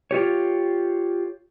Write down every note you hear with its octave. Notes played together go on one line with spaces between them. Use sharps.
F4 G4 C#5